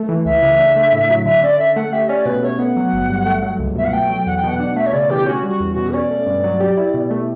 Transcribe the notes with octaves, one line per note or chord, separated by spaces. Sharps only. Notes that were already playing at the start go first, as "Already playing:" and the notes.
Already playing: A3
E3
C#2 E5
C#3
D4
A3
A2
F#3
D3 E5
C#4 D5
D3 E5
A3 F#5
G4 E5
C#4 D5
B2 B4
A3 C#5
B3 F#5
F#3
G1
G2
A3
F#3
C#2
B2 E5
F#5
A3 G5
F#3
E2 F#5
G5
B2 F#5
D4 F#5
A3 E5
C#5
C#3 D5
E3 G4
C#4 F#4
G3
F#4
E2
F#4
B2
C#4 D5
A3
G2
F#3
G4
E4
B2
A3